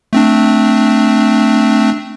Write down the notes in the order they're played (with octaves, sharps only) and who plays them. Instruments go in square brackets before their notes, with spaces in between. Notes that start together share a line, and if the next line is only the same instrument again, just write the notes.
[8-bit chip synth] A3 C4 D4